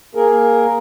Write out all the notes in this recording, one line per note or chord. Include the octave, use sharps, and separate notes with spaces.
A#3 G#4 A#4